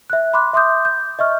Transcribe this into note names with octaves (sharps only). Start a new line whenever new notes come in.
E5 F#6
B5 C6 D6 F#6
E5 C6 D6 D#6 G6
G6
D#5 E5 C#6 F6